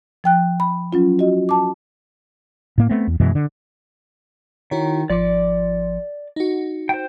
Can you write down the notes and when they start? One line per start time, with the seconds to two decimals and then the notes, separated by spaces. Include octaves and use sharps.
0.24 F3 G5 F#6
0.60 B5
0.93 F#3 C#4 F4
1.19 F#4 D#5
1.49 A5 D6
2.78 A2 A#3
2.89 A3 B3 C4
3.07 E2
3.20 F#2 B2 E3 G#3
3.35 D3
4.71 D#3 E4 F#4 C#5
5.10 G#1 F3 D5 D6
6.36 D#4 F#4
6.89 C5 G5